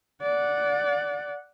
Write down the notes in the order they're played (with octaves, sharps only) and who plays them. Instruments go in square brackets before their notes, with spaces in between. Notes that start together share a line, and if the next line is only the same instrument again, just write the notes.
[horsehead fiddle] D5 F#5